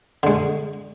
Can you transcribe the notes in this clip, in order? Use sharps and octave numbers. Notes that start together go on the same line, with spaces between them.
D3 G#3